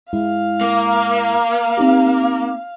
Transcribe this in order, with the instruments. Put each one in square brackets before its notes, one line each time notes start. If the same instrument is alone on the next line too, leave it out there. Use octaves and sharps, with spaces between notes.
[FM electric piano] G#2 G#3 E4 [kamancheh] F5
[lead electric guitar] A#3
[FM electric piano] C4 D#4 G4